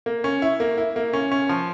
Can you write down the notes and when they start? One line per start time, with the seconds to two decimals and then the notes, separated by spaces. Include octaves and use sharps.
0.06 A#3
0.24 C#4
0.42 E4
0.60 A#3
0.78 E4
0.96 A#3
1.13 C#4
1.32 C#4
1.49 F3